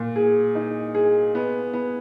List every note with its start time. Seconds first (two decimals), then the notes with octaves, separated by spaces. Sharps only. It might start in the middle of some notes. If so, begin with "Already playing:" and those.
Already playing: A#2
0.16 G#4
0.55 D#4
0.95 G#4
1.35 B3
1.73 B3